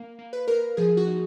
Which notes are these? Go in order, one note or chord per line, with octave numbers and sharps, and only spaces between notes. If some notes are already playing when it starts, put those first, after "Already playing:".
Already playing: A#3 F5
A#3
B4
A#3 A#4
F3 G#4
F#4
D#4